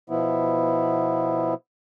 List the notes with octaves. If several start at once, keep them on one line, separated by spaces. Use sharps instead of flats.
B2 F3 B3 E4